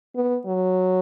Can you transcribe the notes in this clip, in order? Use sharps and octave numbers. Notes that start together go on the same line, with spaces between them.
B3
F#3